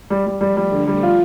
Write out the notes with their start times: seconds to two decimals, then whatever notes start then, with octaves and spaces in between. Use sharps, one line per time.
0.10 G3
0.26 G3
0.41 F3 G3 A3
0.57 G3
0.72 D3 F3 A3
0.87 G3
1.03 F4